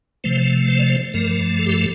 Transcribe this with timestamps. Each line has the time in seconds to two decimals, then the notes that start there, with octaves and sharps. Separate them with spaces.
0.24 C3 F3 A3 C5
0.69 C5
0.79 D5
0.90 C5
1.14 G2 F3 A3 A#4
1.59 A4
1.66 G4
1.73 A4